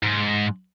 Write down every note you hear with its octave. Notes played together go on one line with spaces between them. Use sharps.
G#2